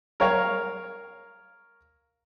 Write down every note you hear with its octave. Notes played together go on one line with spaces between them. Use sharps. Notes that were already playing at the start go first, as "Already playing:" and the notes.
A#4 C#5 F5